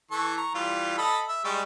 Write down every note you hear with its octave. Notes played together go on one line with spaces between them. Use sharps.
E3 A4 C#6
A#5 C#6
E3 G3 F4
A4 D#5 B5
E5
G3 G#3 C#6